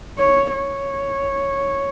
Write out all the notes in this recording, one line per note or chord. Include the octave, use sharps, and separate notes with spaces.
C#5
C#5